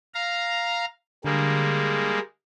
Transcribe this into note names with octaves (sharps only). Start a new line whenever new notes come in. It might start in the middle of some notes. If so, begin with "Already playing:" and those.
F5 A#5
D3 G3 G#3 A#3